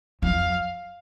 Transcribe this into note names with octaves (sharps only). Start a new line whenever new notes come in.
F2 F5